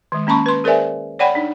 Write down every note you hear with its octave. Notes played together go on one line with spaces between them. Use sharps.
D#3 G#3
A#3 C#4 A5 B5 C#6
B4 C6
G#4 A#4 C5 D5 E5 G#5
C#5 D5 F#5 G5 B5
D4 D#4